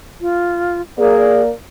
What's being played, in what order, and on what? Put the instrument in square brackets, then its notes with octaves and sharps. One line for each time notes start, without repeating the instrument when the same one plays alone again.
[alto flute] F4
[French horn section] A#3 D5 [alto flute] G#4